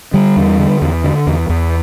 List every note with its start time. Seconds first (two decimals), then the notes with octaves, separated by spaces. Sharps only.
0.14 D3 G3
0.37 E2
0.59 D3
0.82 E2
1.04 D3
1.27 E2
1.49 E2